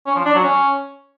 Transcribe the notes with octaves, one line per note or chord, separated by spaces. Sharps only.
C#4
F3
D4
F#3
C#4